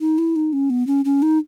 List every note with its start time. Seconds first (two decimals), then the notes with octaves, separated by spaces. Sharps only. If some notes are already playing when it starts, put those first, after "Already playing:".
0.01 D#4
0.18 E4
0.36 D#4
0.53 C#4
0.70 B3
0.87 C#4
1.05 C#4
1.22 D#4